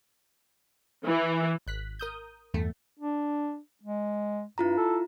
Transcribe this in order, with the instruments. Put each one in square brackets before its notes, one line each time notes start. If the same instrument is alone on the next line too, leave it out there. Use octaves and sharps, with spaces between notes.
[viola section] E3
[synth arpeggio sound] G#1 F#6 B6
A#4 D#6 G6
E2 G2 A3
[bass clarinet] D4
G#3
[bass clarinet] G2 [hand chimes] E4 F4 A#5
[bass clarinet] A4